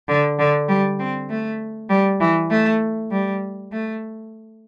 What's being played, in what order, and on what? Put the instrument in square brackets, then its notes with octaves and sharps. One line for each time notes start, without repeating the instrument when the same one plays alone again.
[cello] D3
D3
G3
C4
A3
G3
E3
A3
G3
A3